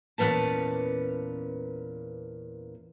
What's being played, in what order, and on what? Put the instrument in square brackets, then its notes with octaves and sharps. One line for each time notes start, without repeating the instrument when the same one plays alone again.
[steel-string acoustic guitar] E2 A#2 C#3 C#4 B4 A5